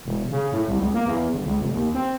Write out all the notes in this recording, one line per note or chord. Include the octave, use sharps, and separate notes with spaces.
E1
C#3
A2
C2
C#2
A#3
E2
G1
C#2
F1
D#2
C4